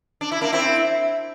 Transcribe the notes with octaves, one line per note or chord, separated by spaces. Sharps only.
D4
E4
A#3 D4
C4 E4